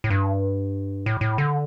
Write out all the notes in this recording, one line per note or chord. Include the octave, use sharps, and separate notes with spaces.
A2
G2
A2
A2
D3